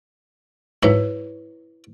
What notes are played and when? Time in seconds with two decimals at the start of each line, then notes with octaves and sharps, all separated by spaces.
0.83 G#2 F#3 E4 B4 C#5 E5